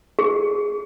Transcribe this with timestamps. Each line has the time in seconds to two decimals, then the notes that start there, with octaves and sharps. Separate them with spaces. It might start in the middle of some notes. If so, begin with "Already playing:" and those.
0.19 G#4